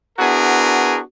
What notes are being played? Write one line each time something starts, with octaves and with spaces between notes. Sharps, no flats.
B3 D4 E4 F#4 G#4 A#4